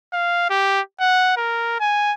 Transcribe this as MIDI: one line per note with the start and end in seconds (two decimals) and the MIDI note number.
0.13 0.47 77
0.50 0.81 67
1.00 1.32 78
1.37 1.75 70
1.80 2.14 80